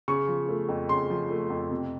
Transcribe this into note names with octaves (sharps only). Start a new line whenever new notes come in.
C#3 C#6
F3
A3
F2
C#3 C6
F3
A3
F2
C3